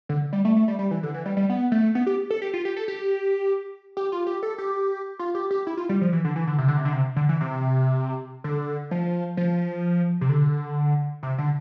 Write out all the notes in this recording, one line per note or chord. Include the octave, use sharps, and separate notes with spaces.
D3
G3
A3
A3
G3
G3
E3
D3
E3
G3
G3
B3
A3
B3
G4
A4
G4
F4
G4
A4
G4
G4
F4
G4
A4
G4
F4
G4
G4
E4
F4
G3
F3
E3
D3
E3
D3
C3
D3
C3
D3
C3
D3
E3
C3
D3
F3
F3
C3
D3
C3
D3